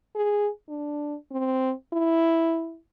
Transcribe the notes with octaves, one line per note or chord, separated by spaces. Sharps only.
G#4
D4
C4
E4